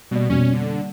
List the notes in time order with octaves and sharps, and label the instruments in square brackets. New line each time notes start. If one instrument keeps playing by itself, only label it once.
[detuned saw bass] B2 [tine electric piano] G3 A#3 D5
[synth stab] F2 B2 [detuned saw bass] C#4
[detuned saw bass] D3